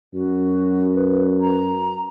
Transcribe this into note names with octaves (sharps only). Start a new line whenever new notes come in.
F#2 F#4
B4
A#5